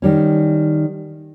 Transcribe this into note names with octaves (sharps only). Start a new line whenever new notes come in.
D#3 G3 C#4